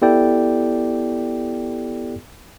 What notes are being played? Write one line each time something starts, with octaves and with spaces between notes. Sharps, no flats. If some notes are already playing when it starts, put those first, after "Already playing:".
B3 E4 G4 A4 D5 G5